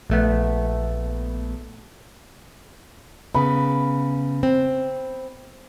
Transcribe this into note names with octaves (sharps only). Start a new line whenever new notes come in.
A#1 A3 B3
C#3 B3 B5
C4